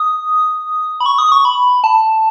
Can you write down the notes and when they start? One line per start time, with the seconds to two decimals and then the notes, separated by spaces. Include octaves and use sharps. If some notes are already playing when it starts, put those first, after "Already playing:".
Already playing: D#6
1.00 B5
1.06 C#6
1.18 D#6
1.32 C#6
1.45 B5
1.84 A5